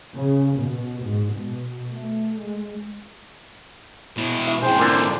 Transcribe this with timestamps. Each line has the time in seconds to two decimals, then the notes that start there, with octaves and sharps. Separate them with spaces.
0.14 C#3
0.56 B2
1.01 G#2
1.33 B2
1.92 A3
2.42 G#3
4.17 B2 E4
4.47 E3
4.62 G#2 E3 G#4 C5 G5
4.79 A#2 D3